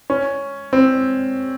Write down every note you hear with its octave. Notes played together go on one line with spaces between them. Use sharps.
C#4
C4